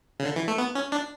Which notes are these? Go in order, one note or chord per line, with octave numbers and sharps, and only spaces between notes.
C#3
D3
E3
A3
B3
C#4
D4